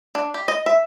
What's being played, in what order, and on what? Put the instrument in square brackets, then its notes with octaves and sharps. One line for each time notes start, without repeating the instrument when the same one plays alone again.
[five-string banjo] D4
G4
D#5
E5